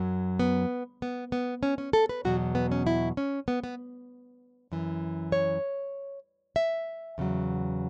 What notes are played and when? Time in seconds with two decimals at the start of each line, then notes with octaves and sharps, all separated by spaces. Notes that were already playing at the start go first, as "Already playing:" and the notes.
Already playing: F#2 F#3
0.40 B3
1.02 B3
1.32 B3
1.63 C#4
1.78 C#4
1.93 A4
2.09 B4
2.25 E2 B2 F#3 F#4
2.55 B3
2.72 C#4
2.87 E4
3.17 C#4
3.48 B3
3.64 B3
4.72 F#2 E3
5.32 C#5
6.56 E5
7.18 E2 C#3 F#3